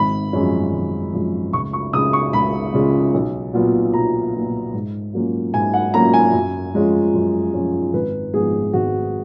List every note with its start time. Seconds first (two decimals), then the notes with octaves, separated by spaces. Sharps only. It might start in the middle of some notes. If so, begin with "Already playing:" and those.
Already playing: G#1 B5
0.33 F#2 F3 G#3 C#4
0.74 G#1
1.13 F#2 F3 G#3 C#4
1.53 C#2 C#6
1.73 C#6
1.93 C#3 G#3 C#4 F4 D#6
2.13 C#6
2.33 C#2 B5
2.74 C#3 G#3 C#4 F4
3.14 B1
3.53 A#2 F#3 B3 F4
3.93 B1 A#5
4.34 A#2 F#3 B3 F4
4.74 G#2
5.14 F#3 A#3 C#4 F4
5.53 G#2 G#5
5.74 F#5
5.94 F#3 A#3 C#4 F4 A#5
6.14 G#5
6.34 F#2
6.74 F3 G#3 C#4 F4
7.14 F#2
7.54 F3 G#3 C#4 F4
7.94 G#1 B4
8.34 G#2 F3 B3 G#4
8.73 G#1 F#4